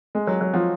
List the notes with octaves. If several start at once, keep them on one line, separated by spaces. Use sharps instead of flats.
G#3
F#3
F#3
F3